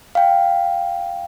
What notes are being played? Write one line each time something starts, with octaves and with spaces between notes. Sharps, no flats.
F5 G5